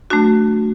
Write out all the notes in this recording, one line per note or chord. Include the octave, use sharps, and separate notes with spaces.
F#3 A3 D4 F#4